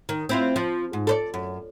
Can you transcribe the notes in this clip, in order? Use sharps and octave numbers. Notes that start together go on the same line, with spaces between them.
D#3
C4 E4 F4
F3
G#2
A4 C5 D5
F#2